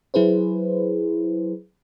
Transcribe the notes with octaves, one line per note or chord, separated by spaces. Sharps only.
F#3 E4 G#4 B4 C5